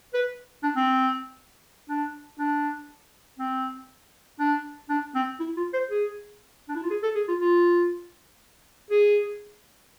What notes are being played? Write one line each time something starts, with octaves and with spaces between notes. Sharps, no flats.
B4
D4
C4
D4
D4
C4
D4
D4
C4
E4
F4
C5
G#4
D4
E4
F4
G#4
A4
G#4
F4
F4
G#4